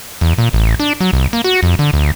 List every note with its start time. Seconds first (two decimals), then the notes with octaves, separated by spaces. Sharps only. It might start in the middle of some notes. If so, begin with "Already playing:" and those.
0.21 E2
0.38 A#2
0.53 A1
0.80 D4
1.00 F#3
1.13 C2
1.33 A#3
1.44 F#4
1.63 F2
1.79 D3
1.93 D2